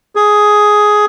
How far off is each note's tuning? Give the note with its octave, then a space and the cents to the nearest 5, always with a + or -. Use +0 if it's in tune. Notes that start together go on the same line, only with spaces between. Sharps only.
G#4 +5